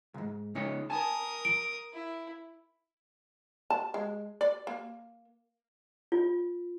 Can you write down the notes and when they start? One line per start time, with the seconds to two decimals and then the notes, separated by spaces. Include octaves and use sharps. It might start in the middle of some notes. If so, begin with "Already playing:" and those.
0.14 B1 G#2
0.55 C#2 D#4 C#5
0.90 A#4 G#5 A5 D#6
1.45 D7
1.92 E4
3.70 A5
3.94 G#3
4.41 D5
4.67 A#3
6.12 F4